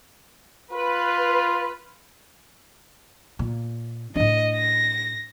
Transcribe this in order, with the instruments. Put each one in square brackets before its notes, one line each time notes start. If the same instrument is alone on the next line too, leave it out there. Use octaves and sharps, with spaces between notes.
[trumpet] F4 [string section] B4
[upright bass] A#2
[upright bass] A2 D4 [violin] D#5
[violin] A#6